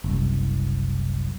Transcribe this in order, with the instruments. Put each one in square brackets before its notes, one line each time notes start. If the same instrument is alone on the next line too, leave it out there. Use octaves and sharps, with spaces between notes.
[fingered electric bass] F#1 C2